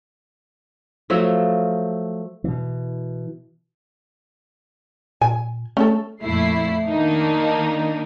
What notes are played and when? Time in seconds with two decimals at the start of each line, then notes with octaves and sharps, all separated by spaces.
1.10 F3 F#3 A3
2.44 B2 E3
5.21 A#2 G#5
5.77 A3 C#4 A4
6.23 F2 A#2 A3 E4 C7
6.87 D#3 A#3 D4 D#4